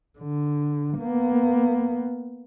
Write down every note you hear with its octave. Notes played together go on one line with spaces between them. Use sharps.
D3
A#3 B3